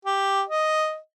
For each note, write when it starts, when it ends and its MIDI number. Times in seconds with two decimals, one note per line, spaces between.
0.05 0.42 67
0.49 0.97 75